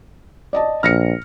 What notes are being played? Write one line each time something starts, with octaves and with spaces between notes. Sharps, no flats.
D5 D#5 A5
A#1 F6 A#6 C#7